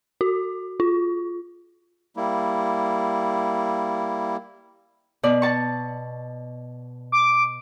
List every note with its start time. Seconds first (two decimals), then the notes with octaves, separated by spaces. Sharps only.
0.21 F#4
0.80 F4
2.17 G3 A#3 E4
5.23 B2 D5
5.42 A5 C#6
7.12 D6